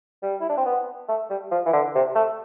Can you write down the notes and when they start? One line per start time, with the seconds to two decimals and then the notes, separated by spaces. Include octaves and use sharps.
0.22 G3
0.40 E4
0.49 D4
0.57 C4
0.65 B3
1.08 A3
1.30 G3
1.51 F3
1.66 E3
1.73 D3
1.95 C3
2.15 A3